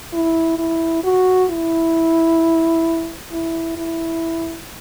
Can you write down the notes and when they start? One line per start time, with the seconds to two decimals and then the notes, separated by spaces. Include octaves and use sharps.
0.13 E4
0.58 E4
1.04 F#4
1.50 E4
3.32 E4
3.77 E4